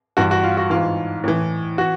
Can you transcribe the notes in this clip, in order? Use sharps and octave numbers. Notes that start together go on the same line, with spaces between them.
G2 E3 F#4
F#4
F4
F#4
G#2 E3 F4
A2 E3
E3 F#4